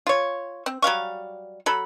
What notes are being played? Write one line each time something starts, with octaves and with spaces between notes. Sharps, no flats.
F4 C#5
C4
F#3 G3 F5 C#6
F#3 A4 B5